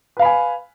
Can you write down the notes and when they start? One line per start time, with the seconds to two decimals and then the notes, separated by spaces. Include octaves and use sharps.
0.17 B4
0.19 F5
0.22 B5
0.25 G#5